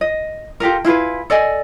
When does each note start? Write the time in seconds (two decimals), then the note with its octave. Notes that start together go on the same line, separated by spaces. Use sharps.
0.01 D#5
0.60 F4 G4 A4 A#4
0.85 E4 F4 G#4 B4
1.30 A4 D5 D#5 G#5